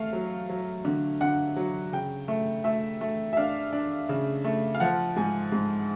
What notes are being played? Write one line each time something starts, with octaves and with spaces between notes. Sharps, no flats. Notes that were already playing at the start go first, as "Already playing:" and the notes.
Already playing: A3 F5
F#3
F#3
D3
D3 F#5
F#3
C#3 G5
A3
A3 E5
A3
E5
D4 F5
D4
C#3
A3
F5
F3 F#5
G#2 G#5
G#2